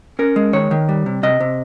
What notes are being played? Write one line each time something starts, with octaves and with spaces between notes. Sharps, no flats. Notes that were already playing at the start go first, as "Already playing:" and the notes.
C#4 A#4
G#3
D#3 C#5
D#3
G3
C3
C3 D#5
C3